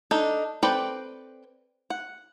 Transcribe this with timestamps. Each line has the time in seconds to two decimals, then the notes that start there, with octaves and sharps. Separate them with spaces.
0.11 D4 D#4 A4
0.63 C4 A4 B4 D5 G5
1.90 F#5